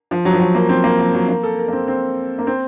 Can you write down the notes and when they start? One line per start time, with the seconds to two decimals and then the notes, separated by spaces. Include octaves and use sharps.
0.11 F3
0.25 F#3
0.33 F3
0.40 F#3
0.55 A#3
0.69 C4
0.84 A#3
0.99 F3
1.14 F#3
1.29 A#3
1.43 A4
1.58 A#4
1.68 A#3
1.73 C4
1.87 C4
2.39 A#3
2.47 C4